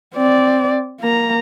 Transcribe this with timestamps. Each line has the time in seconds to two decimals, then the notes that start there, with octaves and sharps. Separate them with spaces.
0.15 C4 D5
1.00 A#3 A#5